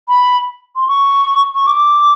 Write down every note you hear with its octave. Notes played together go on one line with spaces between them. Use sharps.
B5
C6
C#6
C#6
D6